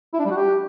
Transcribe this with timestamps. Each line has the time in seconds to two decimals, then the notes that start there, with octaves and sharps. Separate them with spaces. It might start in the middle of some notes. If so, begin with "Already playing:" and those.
0.14 E4
0.20 D4
0.25 G3
0.31 F#4
0.37 G4